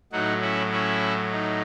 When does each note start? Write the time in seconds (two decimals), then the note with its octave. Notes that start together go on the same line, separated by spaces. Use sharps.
0.12 A2 F#3 D#4 F#4
0.42 C#4 E4
0.72 C#4 E4
1.32 D#4